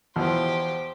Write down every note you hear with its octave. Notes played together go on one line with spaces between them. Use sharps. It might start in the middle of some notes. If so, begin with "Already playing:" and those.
E2 B2 F3 G4 C5